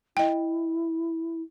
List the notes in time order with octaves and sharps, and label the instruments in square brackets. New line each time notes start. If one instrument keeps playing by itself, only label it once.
[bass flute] E4 [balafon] D#5 G5